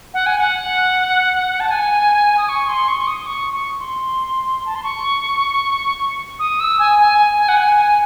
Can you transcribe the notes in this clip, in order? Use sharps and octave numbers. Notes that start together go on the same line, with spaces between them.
F#5
G#5
F#5
A5
G#5
D#6
C#6
C6
C#6
C#6
D#6
D#6
C#6
C#6
C6
A5
C6
C#6
D#6
E6
G#5
G#5
G#5
G#5
F#5
G#5
G#5